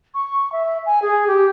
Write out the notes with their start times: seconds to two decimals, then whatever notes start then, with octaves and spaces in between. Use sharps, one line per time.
0.14 C#6
0.52 E5
0.86 G#5
1.02 G#4
1.27 G4